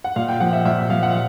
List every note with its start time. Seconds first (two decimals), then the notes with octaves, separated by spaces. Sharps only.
0.04 F#5
0.16 A#2 F5
0.28 G5
0.40 F3 F#5
0.53 E5
0.65 A#2 E5
0.90 F3 F5
1.03 F#5